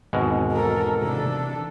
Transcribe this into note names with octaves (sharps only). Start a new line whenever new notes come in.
G#1 E2 B2 G#3
A4 A#4
C3 E3 D4 A4